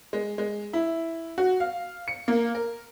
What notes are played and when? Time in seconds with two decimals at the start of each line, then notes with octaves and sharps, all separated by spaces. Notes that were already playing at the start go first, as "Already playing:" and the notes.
0.13 G#3
0.38 G#3
0.73 E4
1.38 F#4
1.60 F5
2.08 C#7
2.28 A#3
2.55 A#4